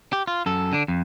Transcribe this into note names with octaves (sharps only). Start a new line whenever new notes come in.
G4
F4
F#2 A4
D3 D4
F2